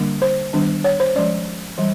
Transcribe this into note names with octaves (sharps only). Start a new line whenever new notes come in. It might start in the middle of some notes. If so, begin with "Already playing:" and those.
Already playing: D3 G3 A#3 D4
C5
D#3 G3 B3 D4
C#5
C5
F3 G#3 C#4 D5
E3 G3